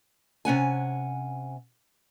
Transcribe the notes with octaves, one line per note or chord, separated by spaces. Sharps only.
C3 C#4 F#5 G#5